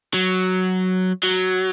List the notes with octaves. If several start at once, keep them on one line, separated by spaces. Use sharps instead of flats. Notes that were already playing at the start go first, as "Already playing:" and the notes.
F#3
F#3